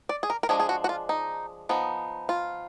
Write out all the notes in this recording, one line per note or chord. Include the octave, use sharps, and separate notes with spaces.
D5
G#4
A#4
A#4
F3 G#3 D4 G#4
G#4
F#4
F#4
F4
D#4
F3 B3 D#4
F4